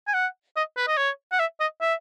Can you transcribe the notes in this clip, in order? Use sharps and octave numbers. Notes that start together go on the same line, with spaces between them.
G#5
F#5
D#5
B4
D#5
C#5
F#5
E5
D#5
E5